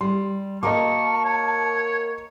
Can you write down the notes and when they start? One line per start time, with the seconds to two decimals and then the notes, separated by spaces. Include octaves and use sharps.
0.01 G3 C6
0.63 A#3 F#4 A#4 D#5 A5 A#5 C#6 D6
1.25 C#5